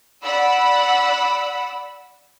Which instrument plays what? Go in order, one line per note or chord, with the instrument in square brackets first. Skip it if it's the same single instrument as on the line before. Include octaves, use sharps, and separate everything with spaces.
[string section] D5 F#5 B5 E6